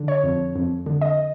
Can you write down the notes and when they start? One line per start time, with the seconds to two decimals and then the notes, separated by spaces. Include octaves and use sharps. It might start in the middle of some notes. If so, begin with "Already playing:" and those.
Already playing: D3
0.08 C#5
0.23 F2
0.56 F2
0.86 D3
1.01 D#5